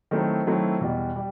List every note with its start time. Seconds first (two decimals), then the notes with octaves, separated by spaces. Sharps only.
0.11 D#3 F#3 A3 C4 E4
0.47 D#3 F#3 A3 C4 E4
0.81 E2 B2 G3
1.16 G3